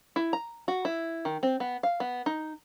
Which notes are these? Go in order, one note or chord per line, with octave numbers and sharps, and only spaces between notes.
E4
A#5
F#4
E4
D#3
C4
B3
F5
B3
D#4